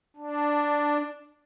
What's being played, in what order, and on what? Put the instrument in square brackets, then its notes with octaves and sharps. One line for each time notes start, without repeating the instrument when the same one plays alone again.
[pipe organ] D4